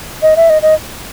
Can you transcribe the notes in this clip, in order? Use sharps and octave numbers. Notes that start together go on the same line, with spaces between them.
D#5
E5
D#5
D#5